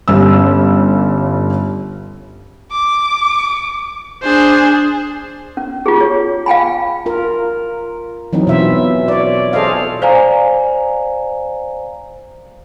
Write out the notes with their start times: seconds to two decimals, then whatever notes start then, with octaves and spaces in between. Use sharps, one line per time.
0.08 G1 G3 C#4 E6
2.71 D6
4.23 D4 G#4 C5
5.57 C#4
5.86 F4 G4 G#4
6.01 C#5
6.46 F5 G5 G#5 B5
7.06 F4 A#4
8.33 E3 F#3 C4 D#4
8.47 B2 E3 F4 E5
9.08 C#5 D5
9.53 G#4 A4 C5 D5 D#5 F5
10.02 C5 D5 F5 G#5 A#5